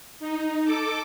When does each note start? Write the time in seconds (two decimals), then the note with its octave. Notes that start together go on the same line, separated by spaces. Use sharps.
0.20 D#4
0.65 A4 D6